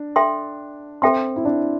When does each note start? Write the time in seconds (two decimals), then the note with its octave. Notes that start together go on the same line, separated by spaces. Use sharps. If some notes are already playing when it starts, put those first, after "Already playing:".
Already playing: D4
0.16 A4 E5 G5 C6
1.02 C4 A4 E5 G5 C6
1.36 E4
1.45 D4